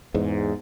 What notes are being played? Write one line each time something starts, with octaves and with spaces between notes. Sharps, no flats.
E2 G#2